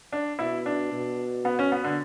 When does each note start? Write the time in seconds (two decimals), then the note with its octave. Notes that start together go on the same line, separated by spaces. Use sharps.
0.12 D4
0.39 B2 E4
0.66 D4
0.92 B2
1.45 B3
1.59 C#4
1.72 B3
1.84 D3